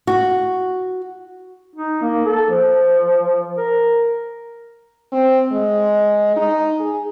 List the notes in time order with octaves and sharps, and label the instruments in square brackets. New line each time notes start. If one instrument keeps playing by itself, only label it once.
[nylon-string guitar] F#4
[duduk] D#4
A#3
A4
F3
A#4
[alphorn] C4
G#3
D#4
G#4